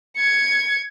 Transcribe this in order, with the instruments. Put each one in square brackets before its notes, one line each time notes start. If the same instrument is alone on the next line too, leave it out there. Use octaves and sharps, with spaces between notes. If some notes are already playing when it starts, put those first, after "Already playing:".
[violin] G#6 C#7